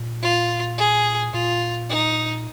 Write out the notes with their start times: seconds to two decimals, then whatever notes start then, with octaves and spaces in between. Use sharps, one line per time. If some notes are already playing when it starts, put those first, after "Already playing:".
Already playing: A#2
0.22 F4
0.78 G#4
1.34 A#2 F4
1.89 D#4